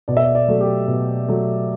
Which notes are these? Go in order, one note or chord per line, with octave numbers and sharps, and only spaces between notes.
B2 D5
E5
D5
D5
F#3 A3
G4
B2
F#3 A3